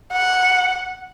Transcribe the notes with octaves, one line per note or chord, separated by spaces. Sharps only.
F#5